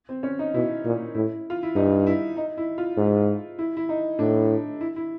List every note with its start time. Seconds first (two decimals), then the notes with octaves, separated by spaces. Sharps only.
0.09 C4
0.23 C#4
0.39 D#4
0.54 B2 E4
0.85 A#2
1.15 A2 E4
1.50 F4
1.63 E4
1.75 G2 D#4
2.07 E4
2.37 D#4
2.57 E4
2.78 F4
2.97 G#2
3.59 E4
3.77 E4
3.89 D#4
4.19 A2 D4
4.81 E4
4.96 E4